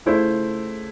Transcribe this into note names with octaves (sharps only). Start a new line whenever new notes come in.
C#3 A3 E4 F4 C5